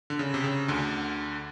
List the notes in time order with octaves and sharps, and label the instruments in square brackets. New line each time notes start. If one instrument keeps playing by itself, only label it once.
[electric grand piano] D3
C#3
C3
C#3
D2 D3